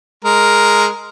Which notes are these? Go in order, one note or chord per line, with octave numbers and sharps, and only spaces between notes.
G#3 A#4